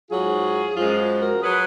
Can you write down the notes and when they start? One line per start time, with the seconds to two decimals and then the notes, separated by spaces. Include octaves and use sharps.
0.10 G#2 F#3 F4 G#4
0.76 F#2 F3 G#3 F4 G#4
1.20 F#4 A#4
1.42 F#3 G#4 B4